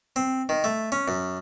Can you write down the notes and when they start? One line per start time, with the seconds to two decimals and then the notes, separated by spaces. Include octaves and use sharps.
0.16 C4
0.49 D#3
0.64 A3
0.92 C#4
1.08 F#2